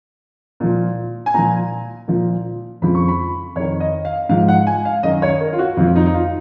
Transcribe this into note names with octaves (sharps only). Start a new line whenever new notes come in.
A#2 F3
G#5
A#2 F3 A#5
A#2 F3
F2 C#3 F3 B5
C#6
B5
F2 D#3 C#5
D#5
F5
G#2 F3 F5
F#5
G#5
F5
F#2 D#3 D#5
C#5
A#4
F4
F#4
F2 F3 F4
D#4
D#4
F4